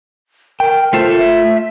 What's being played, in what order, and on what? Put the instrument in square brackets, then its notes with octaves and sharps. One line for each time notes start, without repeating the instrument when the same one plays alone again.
[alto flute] A#4 [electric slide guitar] G5
[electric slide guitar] A3 F4 A4 [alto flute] C5
[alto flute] E5